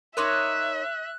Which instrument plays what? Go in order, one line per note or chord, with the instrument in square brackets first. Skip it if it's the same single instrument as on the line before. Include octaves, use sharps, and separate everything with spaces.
[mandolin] D#4 C#5 D#5 [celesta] A#4 C6 D6 [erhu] E5 [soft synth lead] F#6